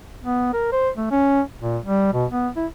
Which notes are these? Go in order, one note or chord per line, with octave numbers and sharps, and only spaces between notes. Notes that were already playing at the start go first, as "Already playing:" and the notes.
B3
A#4
C5
A3
C#4
A#2
G3
B2
B3
E4